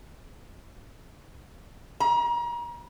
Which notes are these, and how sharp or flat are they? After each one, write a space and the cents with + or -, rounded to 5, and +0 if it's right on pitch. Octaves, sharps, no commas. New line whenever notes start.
A#5 +35